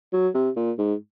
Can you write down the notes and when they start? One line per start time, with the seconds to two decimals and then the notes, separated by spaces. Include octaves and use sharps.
0.13 F#3
0.34 C3
0.56 A#2
0.78 G#2